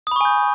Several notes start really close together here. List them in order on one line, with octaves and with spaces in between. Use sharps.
D#6 B5 C#6 G#5 G6